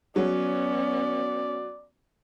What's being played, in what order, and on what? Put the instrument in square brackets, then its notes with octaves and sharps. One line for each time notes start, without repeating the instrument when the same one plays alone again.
[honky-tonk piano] F#3 [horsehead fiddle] B3 C#4 [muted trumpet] D5